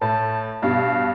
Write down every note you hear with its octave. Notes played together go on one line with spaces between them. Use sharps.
A2 A5
G2 B2 F5